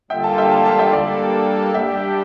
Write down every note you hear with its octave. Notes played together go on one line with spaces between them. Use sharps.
D3 G3 A#3 F4 A4 E5 G5
F5 A5
E5 G5
F5 A5
F5 A5
E5 G5
G3 A#3 D4 A4 D5 F5
G3 D4 G4 E5 G5